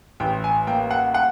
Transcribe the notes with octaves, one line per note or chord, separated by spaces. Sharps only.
A1 G5
G#5
A#3 G5
F#5
F#5